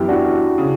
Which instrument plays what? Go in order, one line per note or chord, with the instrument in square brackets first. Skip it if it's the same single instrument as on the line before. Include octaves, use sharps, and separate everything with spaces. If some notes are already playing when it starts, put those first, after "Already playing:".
Already playing: [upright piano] F#2 E3 B3 [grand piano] E4 G4
[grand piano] D4 F#4
[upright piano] C#3